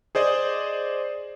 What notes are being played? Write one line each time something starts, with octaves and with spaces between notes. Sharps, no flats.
G#4 C5 D5 D#5